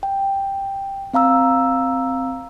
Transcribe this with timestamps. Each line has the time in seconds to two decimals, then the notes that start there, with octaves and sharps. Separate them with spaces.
0.03 G5
1.14 C4 F5 A#5 E6